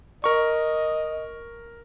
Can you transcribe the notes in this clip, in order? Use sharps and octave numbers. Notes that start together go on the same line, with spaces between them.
A#4 D#5 C#6